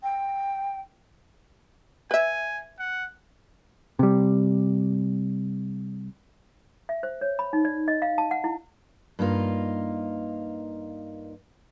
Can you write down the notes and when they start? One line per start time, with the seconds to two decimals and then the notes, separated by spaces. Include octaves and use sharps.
0.03 G5
2.11 B4 E5 G#5
2.79 F#5
3.99 C3 G3
6.89 E5
7.03 C5
7.21 C#5
7.39 B5
7.53 D#4
7.65 D5
7.88 D#5
8.02 F5
8.18 A5
8.31 F#5
8.44 E4
9.19 G2 A#3 D#4 F4